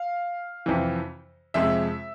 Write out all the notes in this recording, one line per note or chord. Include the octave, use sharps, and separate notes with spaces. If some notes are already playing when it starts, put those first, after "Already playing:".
Already playing: F5
F2 C3 E3
F2 C3 G#3 E5